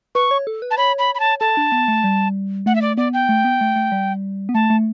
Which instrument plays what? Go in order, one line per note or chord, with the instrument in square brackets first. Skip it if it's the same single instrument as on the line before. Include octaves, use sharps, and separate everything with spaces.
[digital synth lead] B4 [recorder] C#6
[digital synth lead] C#5
A4
B4
[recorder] A5
[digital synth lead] C#5 [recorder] B5
[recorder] B5
B5
A5
[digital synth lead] A4 [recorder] A5
[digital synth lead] D4
B3
A3
G3
[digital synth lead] A3 [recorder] F#5
[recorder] E5
D5
[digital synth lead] B3 [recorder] D5
[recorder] G5
[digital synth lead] A3
B3
A3
A3
G3
B3
[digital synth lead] A3 [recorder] A5
[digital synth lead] A3